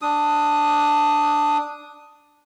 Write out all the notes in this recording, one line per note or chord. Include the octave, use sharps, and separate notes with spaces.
D4 D#6